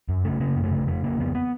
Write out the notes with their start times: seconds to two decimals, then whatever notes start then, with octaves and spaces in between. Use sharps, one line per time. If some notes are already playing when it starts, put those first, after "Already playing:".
0.09 F#2
0.24 C#3 A3
0.40 C#3 A#3
0.56 F#2
0.64 A3
0.71 C#3
0.87 F2 A3
1.03 C#3 A#3
1.19 F2 B3
1.35 B3